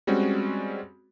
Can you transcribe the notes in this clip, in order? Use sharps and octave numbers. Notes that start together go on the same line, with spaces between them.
G3 G#3 C4 C#4 F#4